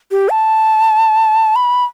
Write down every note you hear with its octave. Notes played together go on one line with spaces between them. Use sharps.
G4
A5
B5